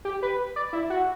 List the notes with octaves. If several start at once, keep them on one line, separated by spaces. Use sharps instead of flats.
G4
B4
D5
E4
F#4